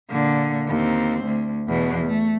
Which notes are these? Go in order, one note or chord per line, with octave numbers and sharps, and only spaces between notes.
A#2 D3
D#2 C4
D2
E2 B2
A3